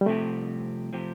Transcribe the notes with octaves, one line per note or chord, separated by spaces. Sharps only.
G3
C2 C3 F3 A3 C4 G4
C3 F3 C4 G4